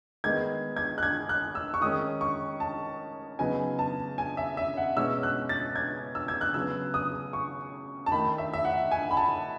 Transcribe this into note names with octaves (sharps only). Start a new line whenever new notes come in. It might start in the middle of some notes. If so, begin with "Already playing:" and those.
D#3 G#3 B3 D#4 G#6
G#6
F#6
G#6
F#6
E6
C#6
D#3 G#3 C#4 D#6
C#6
A5
C#3 F#3 B3 D#4 G#5
A5
G#5
E5
E5
F#5
B2 G#3 C#4 E6
F#6
A6
G#6
E6
G#6
F#6
C#3 F#3 B3 E6
D#6
C#6
A5
D#3 A3 D#4 B5
E5
E5
F#5
G#5
B5
A5